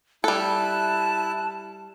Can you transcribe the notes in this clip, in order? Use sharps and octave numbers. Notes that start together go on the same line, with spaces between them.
G3 E4 A4 A5 F#6